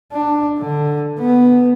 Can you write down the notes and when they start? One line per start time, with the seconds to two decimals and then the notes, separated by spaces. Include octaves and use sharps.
0.13 D4
0.58 D3
1.19 B3